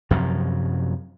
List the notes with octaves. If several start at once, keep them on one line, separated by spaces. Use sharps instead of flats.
F#2 C3 F3 F#3